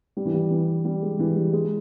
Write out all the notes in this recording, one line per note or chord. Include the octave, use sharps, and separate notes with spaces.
G3
E3
G3
E3
G3
G#3
E3
G3
G#3